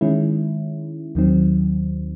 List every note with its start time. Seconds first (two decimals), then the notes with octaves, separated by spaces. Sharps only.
0.01 D#3 G#3 C#4 E4
1.15 D#2 D#3 F#3 C4